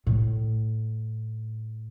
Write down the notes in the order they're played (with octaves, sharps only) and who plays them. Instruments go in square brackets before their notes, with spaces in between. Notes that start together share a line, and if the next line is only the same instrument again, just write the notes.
[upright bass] A2